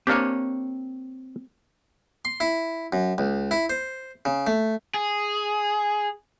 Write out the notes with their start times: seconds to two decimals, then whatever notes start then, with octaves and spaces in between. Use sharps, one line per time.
0.07 A#3 C4 D4 G4 C#5
2.25 C6
2.40 E4
2.93 F#2
3.18 C#2
3.51 E4
3.70 C5
4.25 C#3
4.47 A3
4.94 G#4